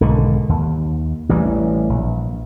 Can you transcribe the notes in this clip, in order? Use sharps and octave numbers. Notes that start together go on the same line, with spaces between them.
B1 G#2 D3 D#3
D#2
A1 E3 G3
A#1